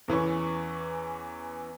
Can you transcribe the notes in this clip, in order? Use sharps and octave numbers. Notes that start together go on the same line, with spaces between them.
E2 E3 C#4 C#6